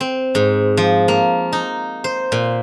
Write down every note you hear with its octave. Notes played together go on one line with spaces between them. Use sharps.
C4
G#2
F3
A#3
D#4
C5
A#2